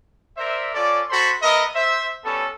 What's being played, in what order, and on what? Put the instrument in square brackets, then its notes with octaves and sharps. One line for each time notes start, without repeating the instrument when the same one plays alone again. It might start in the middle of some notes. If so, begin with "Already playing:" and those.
[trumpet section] A#4 C5 D5 E5
C#4 F4 A4 D5
F#4 A4 C5 B5 C6
B3 A#4 D#5 E5
C5 E5
G3 B3 C#4 A4